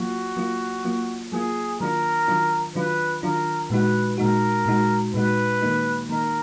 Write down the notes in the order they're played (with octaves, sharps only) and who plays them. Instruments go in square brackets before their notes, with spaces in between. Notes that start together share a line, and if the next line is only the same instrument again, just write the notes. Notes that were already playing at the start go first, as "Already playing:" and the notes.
Already playing: [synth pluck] F#3 A#3 F4 [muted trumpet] F#4
[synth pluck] F#3 A#3 F4
F#3 A#3 F4
[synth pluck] F#3 A#3 F4 [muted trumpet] G#4
[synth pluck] D#3 F#3 D4 F4 [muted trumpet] A#4
[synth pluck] D#3 F#3 D4 F4
[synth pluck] D#3 F#3 D4 F4 [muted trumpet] B4
[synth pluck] D#3 F#3 D4 F4 [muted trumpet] A#4
[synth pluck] A#2 G#3 D#4 F#4 [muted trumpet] B4
[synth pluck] A#2 G#3 D#4 F#4 [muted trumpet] A#4
[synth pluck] A#2 G#3 D#4 F#4
[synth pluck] A#2 G#3 D#4 F#4 [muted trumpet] B4
[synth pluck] D#3 A#3 D#4
[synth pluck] D#3 A#3 D#4 [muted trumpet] A#4